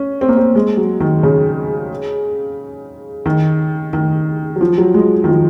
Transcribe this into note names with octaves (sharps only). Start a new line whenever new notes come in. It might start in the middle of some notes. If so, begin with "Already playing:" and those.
Already playing: C#4
C4
A#3
C4
G#3
F#3
D#3
C#3
D#3
D#3
F#3
F3
F#3
G#3
D#3
F3